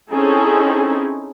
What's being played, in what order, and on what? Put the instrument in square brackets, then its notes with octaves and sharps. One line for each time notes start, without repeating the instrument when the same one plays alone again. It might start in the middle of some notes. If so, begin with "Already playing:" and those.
[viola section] C4 C#4 D#4 E4 G#4 A4